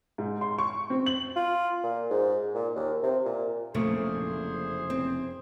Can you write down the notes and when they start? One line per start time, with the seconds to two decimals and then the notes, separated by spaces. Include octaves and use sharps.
0.18 G#2
0.41 C6
0.59 C#6
0.90 C4
1.06 F#7
1.36 F4
1.83 A#2
2.10 G#2
2.55 A#2
2.75 D#2
3.03 C3
3.25 A#2
3.74 F1 F#2 A#2 C#3 A3 E4 G#4 C5
4.90 C4